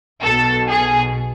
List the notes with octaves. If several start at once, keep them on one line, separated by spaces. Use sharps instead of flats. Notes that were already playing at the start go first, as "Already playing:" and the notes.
B1 B2 A4
G#4